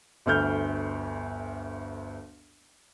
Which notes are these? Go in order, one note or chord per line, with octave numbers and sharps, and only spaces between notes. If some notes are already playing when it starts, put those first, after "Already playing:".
G1 D2 F6 G6